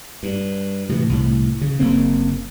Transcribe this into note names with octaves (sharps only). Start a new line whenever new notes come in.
G2
A2 C3 E3
C2 A2
C#3
F#1 C#3 A#3 C4